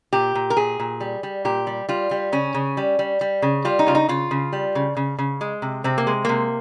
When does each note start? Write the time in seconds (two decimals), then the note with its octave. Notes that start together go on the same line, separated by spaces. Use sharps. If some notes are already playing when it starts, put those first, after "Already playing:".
0.13 A#2 G4
0.35 A#2
0.50 A#4
0.57 A#2 G#4
0.80 A#2
1.00 G3
1.23 G3
1.45 A#2 G4
1.67 G3
1.89 G3 F4
2.11 G3
2.32 C#3 C#4
2.54 C#3
2.77 G3
2.99 G3
3.21 G3
3.42 C#3
3.65 G3 F4
3.79 D#4
3.86 C#3 F4
3.95 D#4
4.09 C#3 F4
4.31 C#3
4.53 G3
4.75 C#3
4.97 C#3
5.19 C#3
5.41 G#3
5.62 C3
5.84 C3 C4
5.98 A#3
6.07 G#3
6.25 C3 A#3